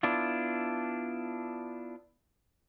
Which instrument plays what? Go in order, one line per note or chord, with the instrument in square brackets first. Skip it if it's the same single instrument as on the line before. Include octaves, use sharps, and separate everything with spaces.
[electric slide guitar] B3 D4 E4 F4